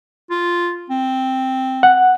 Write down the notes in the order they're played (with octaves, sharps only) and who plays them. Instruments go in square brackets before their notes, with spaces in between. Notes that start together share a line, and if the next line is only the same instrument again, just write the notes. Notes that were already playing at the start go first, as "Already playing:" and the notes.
[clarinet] F4
C4
[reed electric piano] F#5